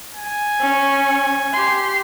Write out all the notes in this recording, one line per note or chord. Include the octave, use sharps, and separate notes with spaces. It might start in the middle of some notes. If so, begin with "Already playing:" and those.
G#5
C#4 C#6
G4 C6